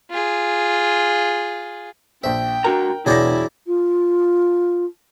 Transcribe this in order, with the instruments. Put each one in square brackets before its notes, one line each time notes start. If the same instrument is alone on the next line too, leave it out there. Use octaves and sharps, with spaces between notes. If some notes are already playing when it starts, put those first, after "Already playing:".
[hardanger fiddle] F4 G#4
[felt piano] A#1 C5 [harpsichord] E5 [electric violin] G5
[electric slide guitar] D4 F#4 A#5 [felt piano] A#4
[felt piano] E1 G6 A#6 [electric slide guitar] B2 [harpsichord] F#3 G#4 D5 [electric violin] E4
[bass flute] F4